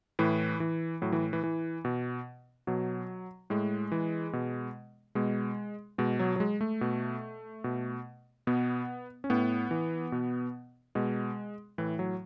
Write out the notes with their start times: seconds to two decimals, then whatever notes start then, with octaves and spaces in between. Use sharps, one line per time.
0.19 A2 E3
0.60 E3
1.02 A2 F#3
1.12 E3
1.33 E3
1.44 E3
1.85 B2
2.67 B2 F#3
3.50 A2 G#3
3.92 E3
4.33 B2
5.15 B2 G#3
5.98 B2 G#3
6.19 F#3
6.36 F#3
6.40 G#3
6.61 A3
6.81 B2
7.64 B2
8.47 B2 B3
9.24 C#4
9.30 A2 B3
9.71 E3
10.12 B2
10.95 B2 G#3
11.78 A2 E3
11.99 F#3